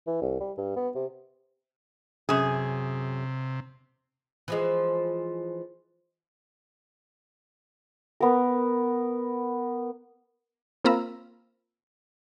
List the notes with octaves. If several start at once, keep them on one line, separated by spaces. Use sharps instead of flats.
E3
C2
G3
G2
B3
C3
F#2 C3 G#4
E3 F3 G#3
B3 A#4
A#3 C4 F4 A#5 B5 E6